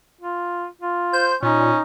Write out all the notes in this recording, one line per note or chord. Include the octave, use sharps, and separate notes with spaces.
F4
F4
C5 G6
A#2 C#4 D#4